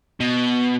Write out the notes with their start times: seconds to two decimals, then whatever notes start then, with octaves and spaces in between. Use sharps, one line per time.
0.20 B2